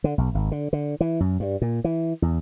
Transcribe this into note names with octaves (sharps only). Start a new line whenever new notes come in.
D3
B1
G#1
D3
D3
E3
F#2
G2
A#2
E3
E2